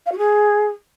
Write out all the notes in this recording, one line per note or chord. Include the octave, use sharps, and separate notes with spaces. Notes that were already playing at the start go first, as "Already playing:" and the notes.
F5
F#4
G#4